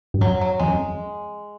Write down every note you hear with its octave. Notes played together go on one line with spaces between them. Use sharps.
G2
F#2 F#3
F#3
F2 G#3
F#2